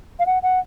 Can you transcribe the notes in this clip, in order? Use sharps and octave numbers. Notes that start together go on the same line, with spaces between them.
F5
F#5
F#5